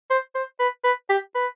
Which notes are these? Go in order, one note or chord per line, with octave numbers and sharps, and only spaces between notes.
C5
C5
B4
B4
G4
B4